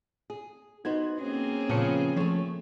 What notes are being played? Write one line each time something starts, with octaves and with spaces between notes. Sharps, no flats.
G#4
B3 D#4 F#4 C5 G#6
A#3 C4 C#4 G#4
A#2 C#3 F3 B3 C#7
F3 A3 A4 C#5